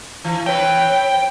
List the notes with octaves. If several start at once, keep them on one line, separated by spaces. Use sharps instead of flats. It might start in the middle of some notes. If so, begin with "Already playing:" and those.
E3
C4 B4 C#5 G5